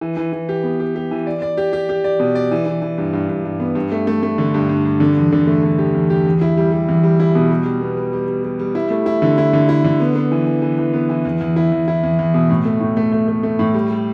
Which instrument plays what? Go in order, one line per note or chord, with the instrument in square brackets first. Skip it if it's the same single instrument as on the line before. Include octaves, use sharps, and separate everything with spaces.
[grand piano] E3
E3
E3
G4
B3
G4
G4
E3
D5
D5
G4
G4
G4
D5
B2
D5
E3
E3
E3
G2
G2
G2
G2
B3
G2
A3
A3
A3
D3
G2
G2
G2
D3
E2
D3
A3
D3
G4
E2
G4
E2
E4
G3
G3
E2
G3
E4
B2
G3
G3
B3
G3
G3
G3
G3
G3
E4
A3
E4
D3
E4
D3
E4
D3
B3
B3
E3
E3
E3
E3
B3
E3
E2
E2
E4
E2
E4
E2
E2
B2
A2
A3
A2
A3
A3
A3
A3
A2
G3
G3